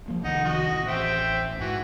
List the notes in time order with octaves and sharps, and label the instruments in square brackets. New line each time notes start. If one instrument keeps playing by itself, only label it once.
[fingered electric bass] F3 A#3
[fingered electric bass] C2 D#3 F3 [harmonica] D#4 F#5
[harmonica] F#4 D#5
[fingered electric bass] A1
[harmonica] C4 E5 G5
[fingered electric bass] G#2 [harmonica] E3 F#4